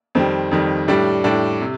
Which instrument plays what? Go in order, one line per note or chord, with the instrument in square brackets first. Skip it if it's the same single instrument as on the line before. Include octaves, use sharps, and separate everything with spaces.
[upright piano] F2 D#3 G3 C4
F2 D#3 G3
A2 G3 D4
A2 G3 D4
C3